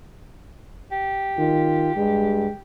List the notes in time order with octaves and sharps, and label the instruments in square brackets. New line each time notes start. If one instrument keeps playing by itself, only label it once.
[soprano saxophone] G4
[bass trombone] D#3 [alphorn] F4
[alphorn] G2 [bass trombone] G#3